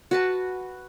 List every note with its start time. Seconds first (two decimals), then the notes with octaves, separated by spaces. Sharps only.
0.11 F#4 B4 A5